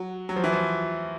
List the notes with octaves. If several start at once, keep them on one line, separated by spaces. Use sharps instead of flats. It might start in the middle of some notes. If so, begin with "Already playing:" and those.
Already playing: F#3
F#3
F3
E3
F3